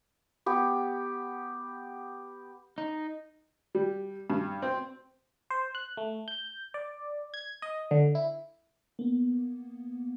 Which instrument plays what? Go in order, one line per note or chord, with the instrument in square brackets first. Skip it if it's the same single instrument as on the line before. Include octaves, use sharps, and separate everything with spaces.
[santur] B3 G4
[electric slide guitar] D#4
[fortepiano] G3
G2
C4
[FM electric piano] C5
F#6
A3
G6
D5
G#6
D#5
D3
E4
A#3 B3